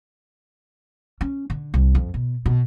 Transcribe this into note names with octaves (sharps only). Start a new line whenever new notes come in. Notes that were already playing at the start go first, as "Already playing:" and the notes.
C#4
D3
C2
F2
B2
B2